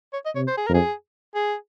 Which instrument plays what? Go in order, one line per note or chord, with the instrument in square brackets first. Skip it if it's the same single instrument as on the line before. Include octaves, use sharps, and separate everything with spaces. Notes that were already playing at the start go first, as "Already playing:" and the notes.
[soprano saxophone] C#5
D#5
[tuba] C3 [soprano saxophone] C#5
[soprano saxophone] C5
G#4
[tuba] F2 [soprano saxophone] A#4
[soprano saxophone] G#4
G#4